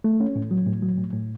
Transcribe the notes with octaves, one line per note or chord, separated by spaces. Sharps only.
A3
C#4
A2
F#3
A2
F#3
A2
A2